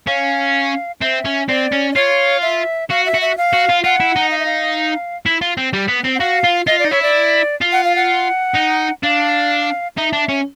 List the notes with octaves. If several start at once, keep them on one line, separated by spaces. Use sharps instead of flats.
C#4 F5
C4 E5
C#4
C4 D5
C#4
D5
F4 C#5
E5
F#4 F5
E5
F#4
E5
F5
F#4
F4
F4 F#5
E4
D#4
F5
E5
F5
E4
F4
C4
G3
B3
C4
F#5
F#4 F5
F4
F4 D#5
D5
D#4
E4 C#5
D5
F4
F#5
F5
F#5
D#4
D4 F5
D#4 E5
D4
C#4